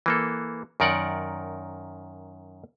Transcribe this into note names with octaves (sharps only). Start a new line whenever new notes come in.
E3 A#3 A4
F#2 D#3 A#4 D5 F#5